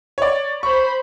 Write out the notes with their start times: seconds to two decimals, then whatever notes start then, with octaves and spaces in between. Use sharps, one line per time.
0.18 C#5 D5
0.63 C5 B5 C#6